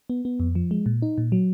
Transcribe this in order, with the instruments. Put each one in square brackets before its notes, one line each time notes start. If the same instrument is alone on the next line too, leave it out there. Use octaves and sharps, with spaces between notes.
[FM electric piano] B3
B3
F2
F3
G#3
A#2
D#4
A#2
F#3